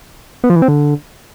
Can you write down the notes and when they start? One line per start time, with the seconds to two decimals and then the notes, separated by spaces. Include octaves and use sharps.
0.44 B3
0.50 F3
0.56 E3
0.62 C4
0.68 D3